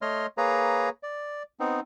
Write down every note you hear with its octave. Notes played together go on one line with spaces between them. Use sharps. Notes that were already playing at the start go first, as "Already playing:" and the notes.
A3 C#5 D#5 C6 F6
A#3 G#4 B4 C#5 A#5
D5
B3 C4 D#4